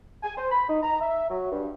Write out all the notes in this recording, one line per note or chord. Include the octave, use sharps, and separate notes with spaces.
G#5
C5
B5
D#4
A#5
E5
F#3
G2